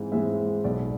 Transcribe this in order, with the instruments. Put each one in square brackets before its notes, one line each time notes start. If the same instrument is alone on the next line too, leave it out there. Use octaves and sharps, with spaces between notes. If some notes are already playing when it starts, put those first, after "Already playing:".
Already playing: [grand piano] G#2 E3 G#3 C4
G#2 E3 G#3 C4 E5
B1 B2 B3 D5